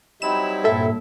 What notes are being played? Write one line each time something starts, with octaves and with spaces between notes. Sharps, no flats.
F#3 G3 C4 D#4 E4 B5 E7
G2 A#2 A4 E5